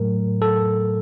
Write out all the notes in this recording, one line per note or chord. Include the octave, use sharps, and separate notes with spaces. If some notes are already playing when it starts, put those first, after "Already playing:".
Already playing: A2 F#3 A3 A#4
A4